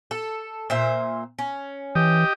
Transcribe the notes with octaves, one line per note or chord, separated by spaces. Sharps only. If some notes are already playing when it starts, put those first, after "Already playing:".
A4
A#2 C5 E5
C#4
E3 G4 D#5